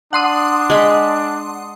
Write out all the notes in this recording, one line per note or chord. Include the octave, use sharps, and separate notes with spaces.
D4 F#5 C6 D#6
G#3 B5